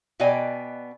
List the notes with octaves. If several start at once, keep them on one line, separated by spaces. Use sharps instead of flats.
B2 B3 D5 D#5 G5 G#5